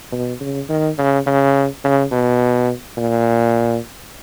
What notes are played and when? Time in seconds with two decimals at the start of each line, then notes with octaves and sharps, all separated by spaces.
0.12 B2
0.41 C#3
0.69 D#3
0.98 C#3
1.26 C#3
1.84 C#3
2.12 B2
2.97 A#2